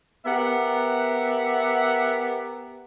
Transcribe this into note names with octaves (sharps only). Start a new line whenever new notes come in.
B3 G4 A#4 E5 F#5